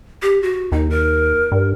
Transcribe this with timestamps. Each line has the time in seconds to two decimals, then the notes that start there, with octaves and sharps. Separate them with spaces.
0.22 G4
0.42 F#4
0.72 D#2 D#4
0.90 A#4
1.52 G2